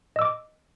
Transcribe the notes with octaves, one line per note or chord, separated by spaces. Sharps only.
D#5 D6 E6